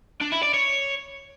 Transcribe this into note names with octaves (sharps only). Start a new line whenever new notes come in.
D4
E4
D5
C#5